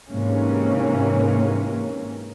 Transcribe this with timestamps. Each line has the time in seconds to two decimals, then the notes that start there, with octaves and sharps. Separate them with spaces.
0.11 G#2 C3 E3 A#3 C#4